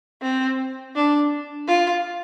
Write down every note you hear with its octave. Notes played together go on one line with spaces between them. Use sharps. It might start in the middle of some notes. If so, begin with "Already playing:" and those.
C4
D4
F4